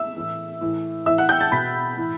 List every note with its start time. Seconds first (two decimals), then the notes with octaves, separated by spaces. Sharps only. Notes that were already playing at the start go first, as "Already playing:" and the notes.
Already playing: E5 E6
0.16 A2 E3
0.61 A2 E3
1.06 A2 E3 E5 E6
1.18 F#5 F#6
1.29 G5 G6
1.41 A5 A6
1.52 B2 B5 B6
1.97 A2 E3